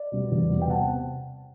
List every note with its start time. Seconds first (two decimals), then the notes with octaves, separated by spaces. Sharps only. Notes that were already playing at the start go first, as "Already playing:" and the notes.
Already playing: D5
0.12 B2 G3 B3
0.32 E2
0.50 B2 G3 B3
0.62 G5
0.70 C3 F#5 A5